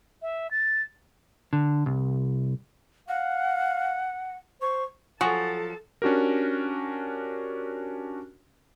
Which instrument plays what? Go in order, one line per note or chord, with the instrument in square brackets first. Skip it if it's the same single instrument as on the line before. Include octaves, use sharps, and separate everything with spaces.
[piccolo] E5
A6
[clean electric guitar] D3
C2
[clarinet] F5 [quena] F#5
[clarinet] C5 [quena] C#6
[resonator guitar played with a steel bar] F3 F#3 [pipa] F#4 G#4 [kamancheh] A4 A5
[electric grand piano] C#4 D4 F#4 G4 A#4